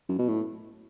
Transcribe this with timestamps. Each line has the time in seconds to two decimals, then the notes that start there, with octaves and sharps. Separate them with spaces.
0.09 F#2
0.19 B2
0.29 A2